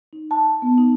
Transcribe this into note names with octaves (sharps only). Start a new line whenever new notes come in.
D#4
A5
B3
D#4